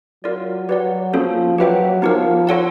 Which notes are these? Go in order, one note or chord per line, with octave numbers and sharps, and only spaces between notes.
F#3 F4 A#4 D5
F#3 G4 B4 D5 F#5
F3 A#3 C#4 F#4 A4
F#3 G4 B4 E5 G5
F3 B3 D#4 G4 A#4
F4 A4 C#5 F#5 A5